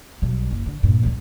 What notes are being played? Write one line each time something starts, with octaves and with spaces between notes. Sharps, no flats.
B1 G3
F#1
D3
G2 A#2
C#2 G3